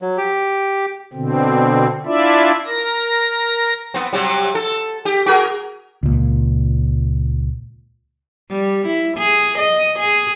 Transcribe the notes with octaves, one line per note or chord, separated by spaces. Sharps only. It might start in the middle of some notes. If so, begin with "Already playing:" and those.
F#3
G4
B2 D3 C4
D4 E4 F4 D5 E5
A#4 A#6
B3 C4
C3 F#3 G3
A4
G4
F#4 G#4 A#4
C#2 A#2
G3
E4
G#4
D#5
G#4